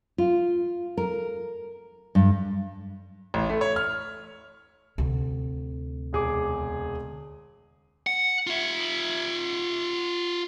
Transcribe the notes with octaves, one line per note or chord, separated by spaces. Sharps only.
F4
A#4
G2
A1
A3
C#5
F6
D2 C3
E1 G#4 D6
F#5
F4 E5